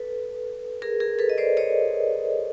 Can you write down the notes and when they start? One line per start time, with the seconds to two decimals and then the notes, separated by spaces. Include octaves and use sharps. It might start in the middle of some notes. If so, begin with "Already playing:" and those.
Already playing: A4 B4
0.82 G#4 A#4
1.00 G#4 A#4
1.19 A4 B4
1.30 D#5
1.38 C5 D5
1.57 C#5 D#5